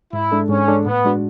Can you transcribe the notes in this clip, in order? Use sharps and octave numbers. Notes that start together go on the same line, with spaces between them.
G#2 E4
G#3 D4 A4
G#2 C#4
G#3 D4 A4
A2 B3
G#3 D4 F#4